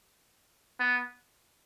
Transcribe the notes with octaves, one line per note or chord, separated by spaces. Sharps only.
B3